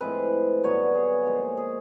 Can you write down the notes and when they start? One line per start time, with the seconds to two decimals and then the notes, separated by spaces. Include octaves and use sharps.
0.01 A2 F3 G#3 C4 B4
0.63 G2 D3 F#3 B3 C#5
0.95 G#4
1.26 A#2 F3 G#3
1.57 G#4